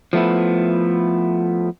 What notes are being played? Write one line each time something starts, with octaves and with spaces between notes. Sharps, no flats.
F3 A3 B3 E4